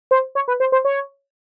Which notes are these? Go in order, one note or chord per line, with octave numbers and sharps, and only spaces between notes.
C5
C#5
B4
C5
C5
C#5